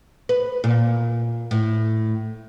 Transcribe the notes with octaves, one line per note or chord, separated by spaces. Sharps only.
B4
A#2
A2